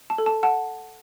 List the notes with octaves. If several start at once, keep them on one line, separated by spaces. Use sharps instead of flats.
A5
A4
A5
F#5 A5